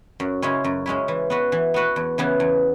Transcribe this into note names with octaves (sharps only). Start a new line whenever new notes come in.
F#2
C#3 G#3 C#4 E4
F#2
C#3 G#3 C#4 E4
E3
B3 F#4 B4
E3
B3 F#4 B4
E2
C#3 E3 B3 E4
E2